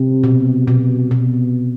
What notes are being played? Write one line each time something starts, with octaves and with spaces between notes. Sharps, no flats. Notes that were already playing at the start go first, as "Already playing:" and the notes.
Already playing: C3
B2
B2
B2